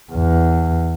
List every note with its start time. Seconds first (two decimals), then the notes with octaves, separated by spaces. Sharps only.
0.12 E2